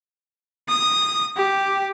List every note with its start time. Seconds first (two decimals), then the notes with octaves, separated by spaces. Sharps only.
0.69 D#6
1.37 G4